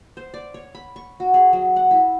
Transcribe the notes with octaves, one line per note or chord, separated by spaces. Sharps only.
C5
D5
C#5
B5
C#6
F#4
G#4
F#3
F#5
E4